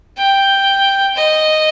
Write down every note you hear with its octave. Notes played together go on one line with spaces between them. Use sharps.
G5
D#5